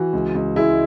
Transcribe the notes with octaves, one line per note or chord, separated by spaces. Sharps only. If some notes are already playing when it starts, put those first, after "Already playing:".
Already playing: E3 F#4
C#2
C#2
G#3 E4